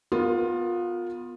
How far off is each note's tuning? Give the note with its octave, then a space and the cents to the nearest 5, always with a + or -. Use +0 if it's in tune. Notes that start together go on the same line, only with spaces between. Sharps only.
B3 +0 F4 +20 A#4 -15